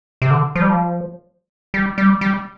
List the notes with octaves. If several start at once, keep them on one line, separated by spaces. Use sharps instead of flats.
C3
D3
F3
G3
F3
G3
G3
G3